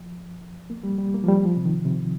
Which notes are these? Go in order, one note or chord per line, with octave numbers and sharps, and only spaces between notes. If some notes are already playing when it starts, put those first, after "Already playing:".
Already playing: F3
A#3
G3
G3
A#3
F3
G3
F3
C3
D#3
C3